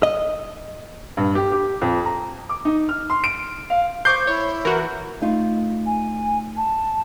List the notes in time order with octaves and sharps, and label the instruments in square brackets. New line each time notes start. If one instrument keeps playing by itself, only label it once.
[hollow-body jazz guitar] D#5
[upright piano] G2
G4
G4
F2
A#5
D6
D#4
F6
C6
D7
F5
[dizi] C5 [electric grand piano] C#6 D6 C7 [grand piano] G6
[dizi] E4 [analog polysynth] C#5
[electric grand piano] E3 [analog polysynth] F#4 A#4
[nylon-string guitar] A3 D#4 F4
[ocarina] G#5
A5